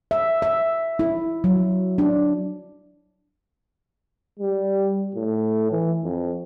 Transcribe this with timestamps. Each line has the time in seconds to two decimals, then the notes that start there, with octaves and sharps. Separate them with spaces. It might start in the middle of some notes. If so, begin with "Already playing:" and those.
0.11 E5
0.42 E5
0.99 E4
1.44 F#3
1.98 D4
4.39 G3
5.15 A2
5.72 E3
6.04 F2